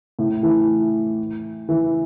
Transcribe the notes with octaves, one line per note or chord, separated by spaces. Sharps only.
A2
E3
E3